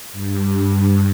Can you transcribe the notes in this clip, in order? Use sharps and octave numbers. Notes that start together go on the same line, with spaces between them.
G2